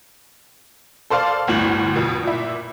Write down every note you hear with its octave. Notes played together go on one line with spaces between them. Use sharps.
A4 C5 D5 F5
G1 D2 A2 F#7
F2 B2
A#2 E4